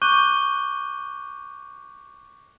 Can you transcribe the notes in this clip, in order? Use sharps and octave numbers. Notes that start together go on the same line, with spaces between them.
C#6 D6 F#6 G6 D#7 G7